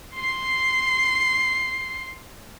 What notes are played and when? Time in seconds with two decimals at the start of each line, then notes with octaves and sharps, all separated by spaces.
0.15 C6 C7